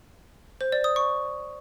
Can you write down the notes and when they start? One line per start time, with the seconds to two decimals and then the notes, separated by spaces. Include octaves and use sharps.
0.61 C5
0.72 D5
0.84 D#6
0.96 C#6